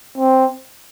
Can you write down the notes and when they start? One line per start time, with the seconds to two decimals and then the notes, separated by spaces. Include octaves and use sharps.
0.18 C4